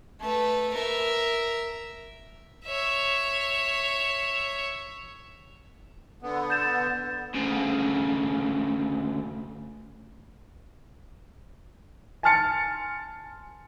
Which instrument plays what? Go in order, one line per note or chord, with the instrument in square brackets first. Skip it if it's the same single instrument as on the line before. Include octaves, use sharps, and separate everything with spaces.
[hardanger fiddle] A3 B4
A#4 E5
[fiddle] C#5 E5
[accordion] D3 B3
[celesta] G6 A6 E7
[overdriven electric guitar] D2 C#3
[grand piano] G#5 A5 C6 F6 A6 C#7